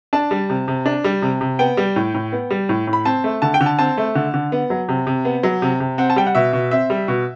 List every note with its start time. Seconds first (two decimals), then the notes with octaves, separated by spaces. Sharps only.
0.13 D4 A5
0.31 G3
0.50 C3
0.68 C3
0.86 D4
1.04 G3
1.22 C3
1.41 C3
1.59 B3 G5
1.77 G3
1.96 A2
2.14 A2
2.32 B3
2.51 G3
2.69 A2
2.87 A2
2.93 B5
3.05 C4 A5
3.24 A3
3.42 D3 A5
3.54 G5
3.61 D3
3.66 A5
3.79 C4 A5
3.98 A3
4.15 D3
4.34 D3
4.52 B3
4.70 F#3
4.89 C3
5.07 C3
5.25 B3
5.43 F#3
5.62 C3
5.80 C3
5.98 C4 F#5
6.10 A5
6.16 G3 G5
6.27 F#5
6.35 B2 E5
6.53 B2
6.71 C4 E5
6.90 G3
7.08 B2